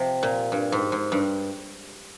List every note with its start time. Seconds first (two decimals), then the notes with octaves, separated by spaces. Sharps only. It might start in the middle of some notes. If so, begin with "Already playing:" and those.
Already playing: C3 F3
0.23 A#2
0.52 G2
0.72 G#2
0.92 G#2
1.12 G2